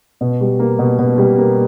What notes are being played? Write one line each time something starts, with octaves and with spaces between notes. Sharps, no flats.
B2
G3
A#3
B2
B2
G3
A#3